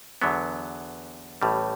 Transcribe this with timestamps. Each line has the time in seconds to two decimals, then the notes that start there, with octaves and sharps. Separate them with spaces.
0.22 E2 D3 F#3 B3
1.42 A1 A2 G3